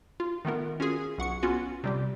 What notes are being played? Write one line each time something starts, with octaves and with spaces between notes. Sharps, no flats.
F4
D#3 A3 B3 A#4
C#4 F4 F#4 G#4
B1 F#5 C#6 C#7
B3 C#4 F4 F#4
C3 G3 G4